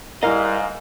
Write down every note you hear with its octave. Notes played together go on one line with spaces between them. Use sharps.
G#2 G3 E4 A#4 D#5 F5 F6